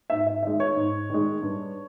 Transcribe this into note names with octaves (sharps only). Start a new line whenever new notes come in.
G#2 E5
E5
D#3 G#3 E5
C#5
G#2
D#3 G#3
G2